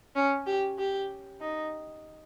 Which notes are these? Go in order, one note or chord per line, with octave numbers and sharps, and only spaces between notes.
C#4
G4
G4
D#4